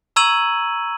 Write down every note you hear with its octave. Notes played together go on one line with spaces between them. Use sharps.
A#5 C#6 E6 G#6 D#7 F#7